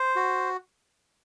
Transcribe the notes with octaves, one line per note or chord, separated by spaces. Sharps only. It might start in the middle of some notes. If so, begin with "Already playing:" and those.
Already playing: C5
F#4